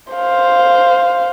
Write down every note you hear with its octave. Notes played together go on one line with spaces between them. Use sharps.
C5 F5